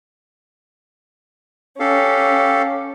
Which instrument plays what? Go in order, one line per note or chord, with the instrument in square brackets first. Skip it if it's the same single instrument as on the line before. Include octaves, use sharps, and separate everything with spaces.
[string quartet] C#4 [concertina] G4 A4 F5